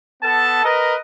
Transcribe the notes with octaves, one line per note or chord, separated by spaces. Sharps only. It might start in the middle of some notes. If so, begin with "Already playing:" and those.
B3 A4 A5
A#4 B4 D#5